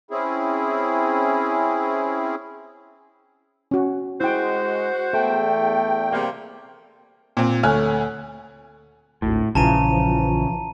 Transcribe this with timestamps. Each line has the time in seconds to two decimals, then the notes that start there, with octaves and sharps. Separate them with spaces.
0.11 C4 C#4 E4 G#4
3.71 C#4 F#4
4.21 G#3 E4 F#4 C5 G5
5.13 E2 A3 A4 G5
6.13 C3 G3 A#3 F5
7.37 A#2 C4
7.63 D2 A3 C#5 G#5 F6 F#6
9.22 G#1 D2 A2
9.55 A#1 C#3 E3 F3 A5 A#5 D#7